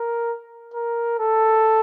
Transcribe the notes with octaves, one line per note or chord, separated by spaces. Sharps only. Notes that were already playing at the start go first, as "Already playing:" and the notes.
Already playing: A#4
A#4
A4